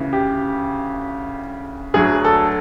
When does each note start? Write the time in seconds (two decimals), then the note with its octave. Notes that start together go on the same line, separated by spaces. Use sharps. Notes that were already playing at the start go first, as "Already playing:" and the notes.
Already playing: D2 C#3 E3
0.13 G4
1.94 D2 D3 F#3 G#4
2.25 A4